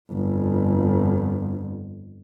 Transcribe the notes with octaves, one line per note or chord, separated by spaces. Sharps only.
G1 F2